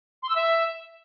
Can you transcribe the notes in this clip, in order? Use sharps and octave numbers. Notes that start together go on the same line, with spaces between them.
C6
E6
E5